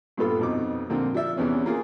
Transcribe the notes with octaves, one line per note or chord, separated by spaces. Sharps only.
G2 A#2 B3 F4 A4 B5
F2 B2 D#4 D6
A#2 D3 F3 A#3 C4
F3 D5 E5
E2 C3 E3 B3 C#4
A#3 F4 G#4